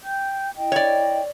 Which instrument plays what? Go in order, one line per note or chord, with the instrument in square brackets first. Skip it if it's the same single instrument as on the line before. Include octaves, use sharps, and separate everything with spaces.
[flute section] G5 G6
E4 D#5 G5
[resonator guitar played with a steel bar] C#5 D5